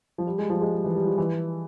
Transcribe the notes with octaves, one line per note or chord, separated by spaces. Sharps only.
F3
G3
G#3
F3
G#3
G3
E3
G3
F3
E3